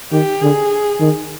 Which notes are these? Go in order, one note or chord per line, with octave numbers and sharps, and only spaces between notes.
D#3 G4
D3 G#4
D#3